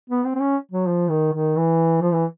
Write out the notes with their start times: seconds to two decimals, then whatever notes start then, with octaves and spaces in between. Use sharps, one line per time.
0.10 B3
0.24 C4
0.35 C4
0.40 C#4
0.71 F#3
0.87 F3
1.09 D#3
1.33 D#3
1.56 E3
2.01 F3
2.13 E3